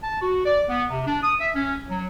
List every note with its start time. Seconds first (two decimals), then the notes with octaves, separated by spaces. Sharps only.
0.02 A5
0.22 F#4
0.45 D5
0.69 B3
0.89 C3
1.06 D4
1.23 D#6
1.40 E5
1.55 C#4
1.89 F#3